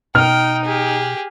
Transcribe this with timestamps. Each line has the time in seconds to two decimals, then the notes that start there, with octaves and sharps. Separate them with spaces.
0.15 B2 D#4 G5 F6
0.65 G4 G#4